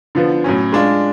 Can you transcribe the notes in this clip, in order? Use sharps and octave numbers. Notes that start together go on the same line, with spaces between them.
D3 F3 B3
A2 F#3 C#4
G#3 D4 F4